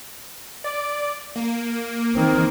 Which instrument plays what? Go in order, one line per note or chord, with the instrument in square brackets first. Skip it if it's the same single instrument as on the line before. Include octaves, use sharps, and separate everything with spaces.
[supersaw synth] D5
A#3
[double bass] D#3 C4